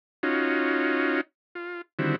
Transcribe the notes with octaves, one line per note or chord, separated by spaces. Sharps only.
C#4 D#4 F4 F#4
F4
D3 D#3 G3 C4 E4 F#4